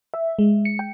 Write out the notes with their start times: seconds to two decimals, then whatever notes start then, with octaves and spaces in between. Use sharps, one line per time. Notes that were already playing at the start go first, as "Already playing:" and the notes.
0.14 E5
0.39 G#3
0.65 C#7
0.79 G5